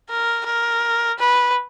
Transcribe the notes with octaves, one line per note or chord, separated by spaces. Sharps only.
A#4
A#4
B4